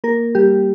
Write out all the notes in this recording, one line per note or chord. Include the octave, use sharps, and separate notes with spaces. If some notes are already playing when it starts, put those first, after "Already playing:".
A#3 A#4
G3 G4